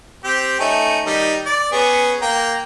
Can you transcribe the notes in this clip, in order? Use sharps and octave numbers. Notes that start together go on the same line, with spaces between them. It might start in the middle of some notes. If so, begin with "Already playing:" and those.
C4 G4
A3 C#4 D#4
D#3 G3 D#4
D5
B3 C#4 G#4
A#3 G5 A#5